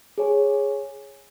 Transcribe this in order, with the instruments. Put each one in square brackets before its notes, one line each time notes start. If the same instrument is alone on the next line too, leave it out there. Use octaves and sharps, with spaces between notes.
[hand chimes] G#4 C#5 G#5